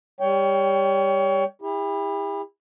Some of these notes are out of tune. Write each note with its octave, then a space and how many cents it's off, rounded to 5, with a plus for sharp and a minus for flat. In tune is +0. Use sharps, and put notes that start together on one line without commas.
G3 +20 C#5 +25 G5 +0
E4 -15 G4 +45